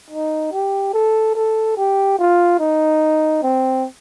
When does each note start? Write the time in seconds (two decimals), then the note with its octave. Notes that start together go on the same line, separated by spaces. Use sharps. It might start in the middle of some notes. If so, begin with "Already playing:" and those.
0.10 D#4
0.52 G4
0.93 A4
1.35 A4
1.77 G4
2.19 F4
2.59 D#4
3.43 C4